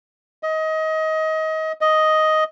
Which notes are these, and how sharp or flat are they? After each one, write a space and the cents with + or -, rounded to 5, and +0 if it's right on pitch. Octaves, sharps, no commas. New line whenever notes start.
D#5 +25
D#5 +5